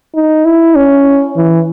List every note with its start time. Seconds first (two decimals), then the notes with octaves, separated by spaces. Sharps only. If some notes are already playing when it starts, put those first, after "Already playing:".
0.15 D#4
0.45 E4
0.76 C#4
1.36 E3